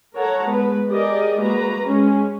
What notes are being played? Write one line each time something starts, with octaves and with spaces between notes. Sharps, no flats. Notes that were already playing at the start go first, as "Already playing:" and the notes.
A4 A#4 C#5 F#5 A5 A#5
G#3 B3 B4
G4 G#4 A#4 D5 D#5
G#3 A#3 F#4 B4 A#5
G#3 C#4